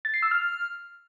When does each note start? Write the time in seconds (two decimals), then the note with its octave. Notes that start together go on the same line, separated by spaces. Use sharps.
0.05 A6
0.14 C7
0.23 E6
0.31 F6